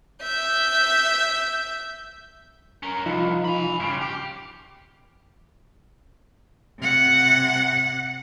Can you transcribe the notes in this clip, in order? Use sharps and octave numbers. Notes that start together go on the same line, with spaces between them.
E5 G6
C#4 A#4
C2 F3 D#4 F4
G#5 B5
G2 C#3 C6 D6 F6
G4
C3 F#5